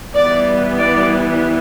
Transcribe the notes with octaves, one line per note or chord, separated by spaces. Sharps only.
E3 G3 B3 D5
D5